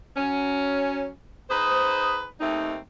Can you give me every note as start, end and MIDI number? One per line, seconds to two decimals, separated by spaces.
0.16 1.09 54
0.16 1.09 61
1.50 2.25 63
1.50 2.25 68
1.50 2.25 71
1.50 2.25 72
2.41 2.77 39
2.41 2.77 57
2.41 2.77 60
2.41 2.77 63